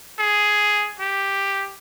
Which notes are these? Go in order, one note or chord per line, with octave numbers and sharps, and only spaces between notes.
G#4
G4